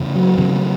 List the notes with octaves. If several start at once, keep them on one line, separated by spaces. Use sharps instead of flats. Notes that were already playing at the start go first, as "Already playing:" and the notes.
Already playing: E2 C#3
F#3
E2 C#3